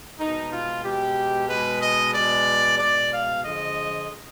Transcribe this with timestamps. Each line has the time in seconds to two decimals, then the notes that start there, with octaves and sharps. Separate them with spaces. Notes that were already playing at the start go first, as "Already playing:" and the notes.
0.19 B2 G#3 D#4
0.51 F4
0.83 B2 G#3 G4
1.48 B2 G#3 B4
1.81 D#5
2.13 B2 G#3 D5
2.78 B2 G#3 D5
3.11 F5
3.43 D3 F3 G#3 D#5